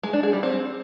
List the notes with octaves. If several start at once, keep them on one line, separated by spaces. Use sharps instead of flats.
G#3
D4
G#4
G3
C4